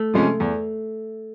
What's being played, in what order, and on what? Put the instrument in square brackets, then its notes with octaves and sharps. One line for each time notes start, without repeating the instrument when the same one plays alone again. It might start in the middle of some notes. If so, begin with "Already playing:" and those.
Already playing: [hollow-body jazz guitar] A3
[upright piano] C3 F3 G#3 C#4
E2